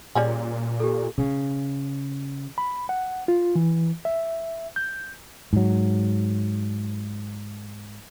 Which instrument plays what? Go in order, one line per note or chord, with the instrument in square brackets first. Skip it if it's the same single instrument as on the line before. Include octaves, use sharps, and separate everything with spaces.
[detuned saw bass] A#2 [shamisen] G3 C#4 G#4
[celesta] G4 A4
[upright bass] C#3
[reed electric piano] B5
F#5
F4
E3
E5
G6
[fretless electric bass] G#2 F#3